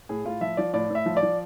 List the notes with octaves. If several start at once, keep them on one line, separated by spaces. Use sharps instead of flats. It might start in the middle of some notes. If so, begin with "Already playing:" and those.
A2 G#4
A2 F4
F3 E5
F3 D5
A2 D5
A2 E5
F3
D5
F3